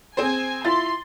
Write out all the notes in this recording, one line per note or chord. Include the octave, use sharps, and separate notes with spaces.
C4 G#4 C5 G#5
E4 F4 C6 A6